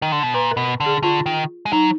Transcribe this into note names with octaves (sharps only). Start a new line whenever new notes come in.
D#3
D3
B2
A#2 B4
A#4
B2
D3
G#4
D3 F4
D#3
G#3
F#3 D#4